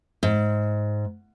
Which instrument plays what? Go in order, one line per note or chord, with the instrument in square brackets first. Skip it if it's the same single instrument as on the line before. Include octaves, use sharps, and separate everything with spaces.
[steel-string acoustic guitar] G#2